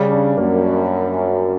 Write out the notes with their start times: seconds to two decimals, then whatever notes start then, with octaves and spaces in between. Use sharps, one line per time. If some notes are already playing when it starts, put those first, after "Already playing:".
Already playing: C#3 G3
0.12 D4
0.37 F#2 A#3
0.63 D4